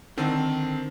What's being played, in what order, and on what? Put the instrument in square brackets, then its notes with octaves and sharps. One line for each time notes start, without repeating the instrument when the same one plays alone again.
[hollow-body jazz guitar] D3 [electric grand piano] D#3 C4